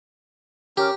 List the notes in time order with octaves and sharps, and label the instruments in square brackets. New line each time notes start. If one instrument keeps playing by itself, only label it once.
[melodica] C#4 A#4 D6 [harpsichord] G4